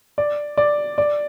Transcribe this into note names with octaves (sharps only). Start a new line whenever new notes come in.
D5
D5
D5